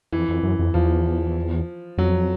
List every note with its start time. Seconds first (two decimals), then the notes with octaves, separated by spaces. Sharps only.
0.13 F2 E3
0.28 F2
0.43 F#2
0.59 F2
0.74 E2 F3
1.98 F2 F#3